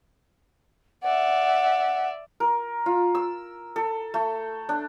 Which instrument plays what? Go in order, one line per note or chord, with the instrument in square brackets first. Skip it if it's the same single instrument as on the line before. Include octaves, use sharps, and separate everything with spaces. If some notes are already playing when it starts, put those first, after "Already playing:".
[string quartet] D5 E5 [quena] F#5
[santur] A#4
F4
E6
A4
A3
D4